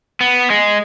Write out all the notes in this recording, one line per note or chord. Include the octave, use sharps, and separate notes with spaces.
B3
G#3